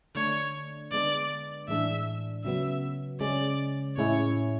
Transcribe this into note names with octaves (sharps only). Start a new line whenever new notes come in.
D3 A3 D4 C#5
D3 G#3 B3 D4 D5
A2 E3 G#3 D4 E5
C#3 F#3 B3 E5
C#3 G#3 C#4 D5
A2 G#3 C#4 E4 C#5